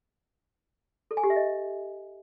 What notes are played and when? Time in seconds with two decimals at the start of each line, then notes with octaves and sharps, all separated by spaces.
1.11 A4
1.17 G#5
1.24 G4
1.30 E5
1.36 D#5